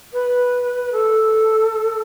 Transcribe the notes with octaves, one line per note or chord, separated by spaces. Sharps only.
B4
A4